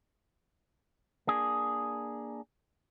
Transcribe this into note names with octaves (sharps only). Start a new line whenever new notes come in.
A#3 D4 G#4